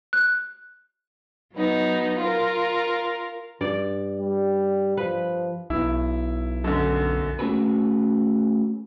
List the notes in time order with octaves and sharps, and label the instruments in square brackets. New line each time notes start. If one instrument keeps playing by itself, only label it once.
[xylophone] F#6
[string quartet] F#3 B3 D#4
F4 A#4
[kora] G2 D5
[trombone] G3
[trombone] F3 [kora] B4
[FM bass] B1 [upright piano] E4
[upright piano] F#2 D3
[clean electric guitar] A3 C#4 F#4 G#4 A4 B4